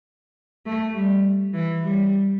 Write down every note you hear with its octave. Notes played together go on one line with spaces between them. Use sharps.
A3
G3
E3
G3